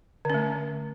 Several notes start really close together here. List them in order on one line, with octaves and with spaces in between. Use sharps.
D3 C#4 A3